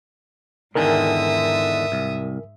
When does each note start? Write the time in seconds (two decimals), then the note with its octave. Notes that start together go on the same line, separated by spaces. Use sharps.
0.75 E2 G#2 D3 D#3 A#4 E5 G#5 D#6
1.92 C2